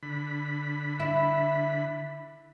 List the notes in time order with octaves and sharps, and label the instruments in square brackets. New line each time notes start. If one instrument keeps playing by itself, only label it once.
[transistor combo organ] D3 B5
[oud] E4